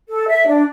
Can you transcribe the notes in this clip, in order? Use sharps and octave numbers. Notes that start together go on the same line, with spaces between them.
A4
E5
D4